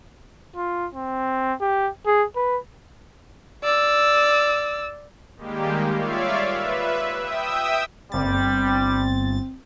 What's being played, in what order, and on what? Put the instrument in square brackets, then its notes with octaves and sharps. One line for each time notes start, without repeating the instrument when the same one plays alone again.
[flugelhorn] F4
C4
G4
G#4
B4
[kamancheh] D5 E6
[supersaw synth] D#3 G3 G#3 A#3 G4
F4 C#5 D5 E5 F5
B4 E5
E5 G5 D#6 E6
[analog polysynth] G1 A6 [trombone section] G3 [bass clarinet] C4